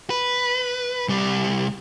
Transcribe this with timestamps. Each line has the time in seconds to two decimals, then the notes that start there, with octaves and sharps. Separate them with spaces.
0.10 B4
1.08 C2 G3